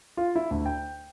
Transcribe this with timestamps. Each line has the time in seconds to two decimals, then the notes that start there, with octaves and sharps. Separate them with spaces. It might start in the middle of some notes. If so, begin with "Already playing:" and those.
0.17 F4
0.35 E4
0.51 D2
0.66 G5